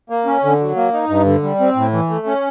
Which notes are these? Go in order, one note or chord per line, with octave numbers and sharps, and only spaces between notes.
A#3
C#4
D3
F#3
A#3
D#4
G2
D3
G3
C4
A2
E3
A3
C#4